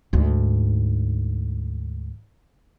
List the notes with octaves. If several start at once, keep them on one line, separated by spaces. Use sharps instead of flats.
D2 G#2